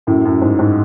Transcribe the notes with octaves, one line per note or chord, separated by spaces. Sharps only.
F#2 A2
F#2
G#2
G#2